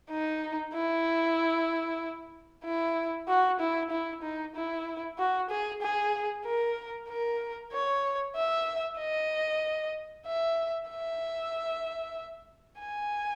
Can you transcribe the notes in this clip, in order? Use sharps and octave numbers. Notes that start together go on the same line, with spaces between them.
D#4
E4
E4
F#4
E4
E4
D#4
E4
F#4
G#4
G#4
A#4
A#4
C#5
E5
D#5
E5
E5
G#5